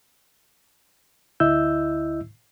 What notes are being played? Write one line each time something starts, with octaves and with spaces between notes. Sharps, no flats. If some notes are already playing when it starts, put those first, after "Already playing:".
D2 E4 D#5 E5 E6 G6